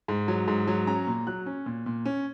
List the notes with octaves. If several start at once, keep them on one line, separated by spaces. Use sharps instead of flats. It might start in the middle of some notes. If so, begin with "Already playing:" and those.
G#2
F#3
G#2
F#3
C#4 A#5
A#2
F#3 F#6
C#4
A#2
A#2
C#4